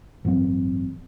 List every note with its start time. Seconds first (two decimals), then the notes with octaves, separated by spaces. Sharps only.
0.25 A1 G2 F#3 C4